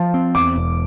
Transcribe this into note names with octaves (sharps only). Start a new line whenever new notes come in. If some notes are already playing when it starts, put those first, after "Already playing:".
Already playing: F3 F5 A5
C4
E2 D6
E1